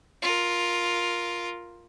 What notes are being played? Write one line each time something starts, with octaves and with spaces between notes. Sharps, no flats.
F4 A#4